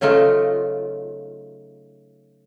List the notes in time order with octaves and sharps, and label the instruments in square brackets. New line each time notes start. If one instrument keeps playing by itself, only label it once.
[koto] C#3 F#3 A3 D#4 F4